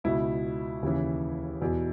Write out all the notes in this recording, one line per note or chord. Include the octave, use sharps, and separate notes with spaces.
C#2 B2 E4
D#2 C#3 E3
E2 B2